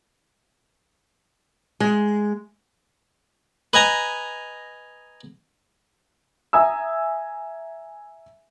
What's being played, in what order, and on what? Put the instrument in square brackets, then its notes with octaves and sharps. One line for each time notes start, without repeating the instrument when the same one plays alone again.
[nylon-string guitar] G#3
[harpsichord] B4 D#5 G#5 A#5
[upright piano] E5 G#5 A#5 D#6 E6